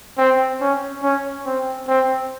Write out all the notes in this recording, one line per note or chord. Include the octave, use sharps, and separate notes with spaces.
C4
C#4
C#4
C4
C4